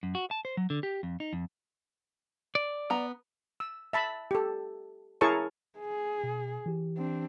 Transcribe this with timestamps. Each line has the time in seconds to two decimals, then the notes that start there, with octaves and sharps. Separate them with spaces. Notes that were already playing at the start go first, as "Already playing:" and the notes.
0.03 F#2
0.15 F#4
0.31 A5
0.45 C5
0.57 F#3
0.70 D3
0.83 G4
1.03 F2
1.20 D#4
1.33 F2
2.55 D5
2.90 B3 A#5
3.60 E6
3.93 E5 A5 B5
4.31 G4 A4
5.21 E4 G#4 A#4 C#5 A5 C#6
5.79 G#4
6.24 B2
6.66 E3 G4
6.97 C4 D4